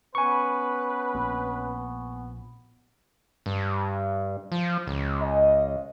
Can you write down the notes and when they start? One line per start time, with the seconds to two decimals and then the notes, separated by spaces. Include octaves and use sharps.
0.15 B3 C#4 B4 G#5 C#6
1.15 A#1 A#2 C4
3.46 G2
4.52 F3
4.87 C#2
5.22 D#5